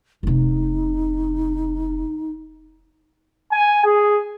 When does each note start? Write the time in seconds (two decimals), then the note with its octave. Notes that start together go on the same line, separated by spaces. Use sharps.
0.23 F1 C3 D#4
3.52 G#5
3.85 G#4